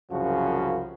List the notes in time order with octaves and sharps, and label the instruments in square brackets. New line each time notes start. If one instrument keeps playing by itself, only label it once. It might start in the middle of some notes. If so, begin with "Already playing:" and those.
[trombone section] C2 F#2 C#3 F3 F#4